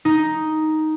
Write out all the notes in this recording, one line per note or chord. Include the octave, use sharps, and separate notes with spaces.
D#4